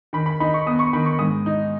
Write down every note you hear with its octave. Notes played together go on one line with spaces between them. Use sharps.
D#3 B5
B5
D#4 B5
C#6
B3 D#6
C#6
D#3 B5
C#6
G#2 D#6
D#4